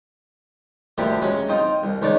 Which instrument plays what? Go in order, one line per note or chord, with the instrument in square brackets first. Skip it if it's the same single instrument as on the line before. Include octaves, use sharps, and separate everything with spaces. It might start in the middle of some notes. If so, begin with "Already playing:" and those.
[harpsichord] D2 F3 G3 E4 G4 A#4
F#3 G#3 C#4
C4 D#4 F4
C2
C#2 D#3 C#5 D5 A5